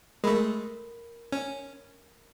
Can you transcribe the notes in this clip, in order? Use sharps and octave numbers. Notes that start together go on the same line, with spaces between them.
G#3 A3 A#4 B5
C#4